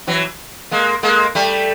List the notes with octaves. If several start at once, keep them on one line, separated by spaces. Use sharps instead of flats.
E3 F#3
G#3 A#3
G#3 A#3
G3 A3